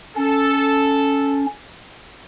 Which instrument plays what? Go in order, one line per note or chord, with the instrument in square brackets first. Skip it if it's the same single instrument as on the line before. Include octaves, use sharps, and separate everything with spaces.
[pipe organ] C#4 [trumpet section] A4